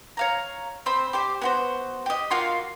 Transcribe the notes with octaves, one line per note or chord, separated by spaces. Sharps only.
C#5 F5 A#5
C4 C5 B5
G4 C5 D5
B3 F#4 C5
G4 D#5
A#3 F4 F#4 C6